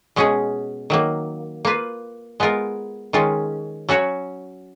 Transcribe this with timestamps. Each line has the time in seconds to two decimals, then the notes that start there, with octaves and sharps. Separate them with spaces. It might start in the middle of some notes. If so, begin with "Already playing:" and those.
0.16 B2 G#3 C#4 G#4
0.90 D#3 F#3 A#3
1.65 A#3 F4 B4
2.40 G#3 B3 F4 A#4
3.13 D#3 G#3 C#4 F4
3.89 F#3 C#4 F#4 C#5